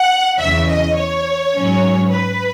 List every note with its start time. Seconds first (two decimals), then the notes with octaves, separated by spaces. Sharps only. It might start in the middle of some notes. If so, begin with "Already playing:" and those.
Already playing: F#5
0.39 E2 C#3 E3 E5
0.68 D#5
0.97 C#5
1.54 G#2 F#3 C#4
2.11 B4